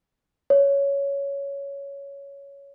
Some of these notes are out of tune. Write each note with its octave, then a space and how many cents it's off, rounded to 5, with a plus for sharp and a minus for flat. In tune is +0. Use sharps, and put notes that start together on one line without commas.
C#5 +10